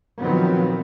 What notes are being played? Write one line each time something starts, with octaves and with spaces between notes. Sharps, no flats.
A#2 D#3 F3 F#3 B3 C4